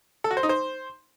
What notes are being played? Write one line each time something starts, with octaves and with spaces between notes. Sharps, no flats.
A4
F#4
C5
D#4
C5